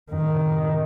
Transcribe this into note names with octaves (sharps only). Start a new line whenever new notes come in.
F#2 D#3
A2
C3